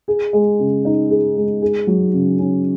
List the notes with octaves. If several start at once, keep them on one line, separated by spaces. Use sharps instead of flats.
G#4
G#3
C#3
D#4
G#4
G#3
G#4
F#3
C#3
C#4